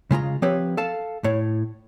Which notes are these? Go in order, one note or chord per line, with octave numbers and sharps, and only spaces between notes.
C#3 G#3 F4 A#5
F3 C4 G4 B4 C#5
A4 F5 A5
A2 C#5